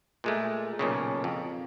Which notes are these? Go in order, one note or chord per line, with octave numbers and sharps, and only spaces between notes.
A#2 G#3 A3
B1 A#2 C#3
F2